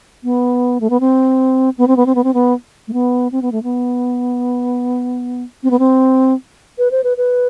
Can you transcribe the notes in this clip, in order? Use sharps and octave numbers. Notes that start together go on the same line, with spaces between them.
B3
A3
B3
C4
B3
C4
B3
C4
B3
C4
B3
A3
B3
C4
B3
A3
B3
C4
B3
C4
B4
C5
B4
B4